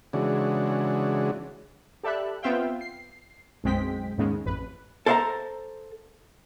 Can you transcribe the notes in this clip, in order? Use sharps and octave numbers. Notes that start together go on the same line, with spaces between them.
C#3 E3 G#3 D4 F#4
G4 A4 D5 E5 B5 F#6
B3 C4 F4 E5 F5 G5
C7
B1 F#2 G#3 C4 G5 B6
D#2 G#2 C#3 G#3
A1 F2 B4
A4 C5 D5 F5 A5 A#5